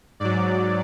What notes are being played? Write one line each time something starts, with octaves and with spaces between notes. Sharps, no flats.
G#2 F#3 D5